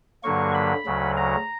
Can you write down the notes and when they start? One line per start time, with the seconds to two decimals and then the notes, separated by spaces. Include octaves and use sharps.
0.23 G2 D3 F#3 A#3 C#6
0.54 B5
0.86 D2 C#3 F#3
1.17 A#5